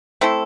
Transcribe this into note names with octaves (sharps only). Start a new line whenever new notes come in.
A3 C4 E4 A4